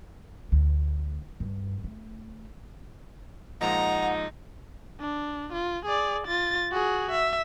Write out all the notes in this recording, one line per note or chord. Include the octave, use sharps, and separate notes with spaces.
D2
G2
A3
A#2 F3 G#3 D#4 F#5 A#5
D4
F4
G#4 D5
F4 A6
F#4 G#4
E5